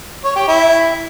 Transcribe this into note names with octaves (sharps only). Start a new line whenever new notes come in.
C#5
G4
E4